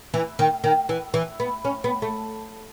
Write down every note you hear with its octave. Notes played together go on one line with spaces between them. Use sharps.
E3
D#3
D#3
E3
E3
B3
C#4
B3
A3